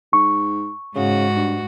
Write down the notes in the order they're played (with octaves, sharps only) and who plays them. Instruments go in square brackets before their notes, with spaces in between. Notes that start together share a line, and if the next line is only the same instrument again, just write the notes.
[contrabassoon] G#2 [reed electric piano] C#6
[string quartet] G#2 F#4 [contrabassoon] C#3
[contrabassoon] G2